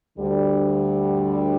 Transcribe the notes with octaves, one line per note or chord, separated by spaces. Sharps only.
D2 D3 G3